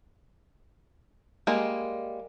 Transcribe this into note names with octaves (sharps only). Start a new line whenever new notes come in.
G3 G#3 A#3